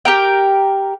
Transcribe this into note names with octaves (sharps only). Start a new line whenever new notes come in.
G4 A#4 G5